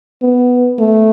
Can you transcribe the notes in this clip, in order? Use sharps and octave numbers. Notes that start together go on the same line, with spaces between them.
B3
A3